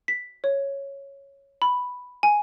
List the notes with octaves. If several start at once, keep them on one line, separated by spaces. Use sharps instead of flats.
B6
C#5
B5
G#5